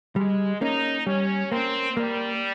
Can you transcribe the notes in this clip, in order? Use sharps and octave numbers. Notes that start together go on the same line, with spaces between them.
G3 G#3
A#3 C#4 D#4
G3 C#4
A#3 C4 C#4
G3 A#3